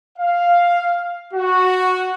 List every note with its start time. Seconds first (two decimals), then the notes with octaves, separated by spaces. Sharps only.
0.17 F5
1.33 F#4